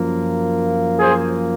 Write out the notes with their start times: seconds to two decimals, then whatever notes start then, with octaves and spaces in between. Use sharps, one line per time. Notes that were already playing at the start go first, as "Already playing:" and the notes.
Already playing: F#2 F3 A#3
1.00 G#4 C5